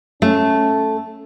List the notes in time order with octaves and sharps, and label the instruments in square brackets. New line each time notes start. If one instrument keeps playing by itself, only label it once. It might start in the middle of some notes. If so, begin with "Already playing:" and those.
[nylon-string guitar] A3 [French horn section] C#4